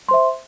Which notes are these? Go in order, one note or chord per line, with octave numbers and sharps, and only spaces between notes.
C5 E5 C6